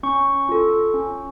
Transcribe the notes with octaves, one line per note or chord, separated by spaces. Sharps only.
C#4 C#6
F4 A4
C#4